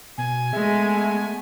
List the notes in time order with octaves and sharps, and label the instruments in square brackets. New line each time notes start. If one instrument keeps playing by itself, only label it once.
[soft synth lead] B2 [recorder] G#5
[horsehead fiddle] G#3 [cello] A3 B3 [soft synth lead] E5